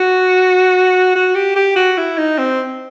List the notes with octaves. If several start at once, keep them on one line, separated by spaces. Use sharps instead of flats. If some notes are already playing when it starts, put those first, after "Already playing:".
Already playing: F#4
F#4
G4
G4
F#4
E4
D#4
C4